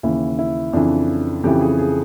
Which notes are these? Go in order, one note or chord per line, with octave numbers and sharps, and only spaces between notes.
D#2 C#3 E3 E4
E4
F2 C#3 E3 D4
F2 C#3 E3 G4
G#4
G#4